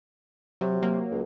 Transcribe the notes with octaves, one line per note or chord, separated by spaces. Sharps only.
C3 F#3
F#3 A#3
C#2